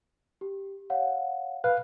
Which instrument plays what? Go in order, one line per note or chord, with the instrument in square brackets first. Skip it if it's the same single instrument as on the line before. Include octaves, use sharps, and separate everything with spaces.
[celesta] G4
C#5 F5 F#5
[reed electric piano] B4 F5 [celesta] F#6